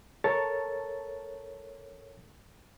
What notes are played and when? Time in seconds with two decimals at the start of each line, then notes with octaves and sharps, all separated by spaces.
0.24 A4 A#4 C#5 A5 A6